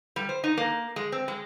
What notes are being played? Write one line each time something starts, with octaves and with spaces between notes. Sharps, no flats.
G3
C5
D#4
A#3
G#3
C4
G#3